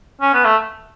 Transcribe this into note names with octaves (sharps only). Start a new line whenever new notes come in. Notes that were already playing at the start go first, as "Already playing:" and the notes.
C#4
B3
A3